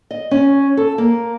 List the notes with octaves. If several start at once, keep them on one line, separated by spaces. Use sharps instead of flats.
D#5
C#4
A4
A#3